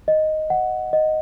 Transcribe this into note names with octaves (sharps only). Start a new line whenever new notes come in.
D#5
F#5
D#5